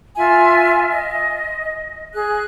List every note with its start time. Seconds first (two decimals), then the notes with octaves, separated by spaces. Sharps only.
0.16 F4 E5 G#5
0.91 D#5
2.13 G#4 F#6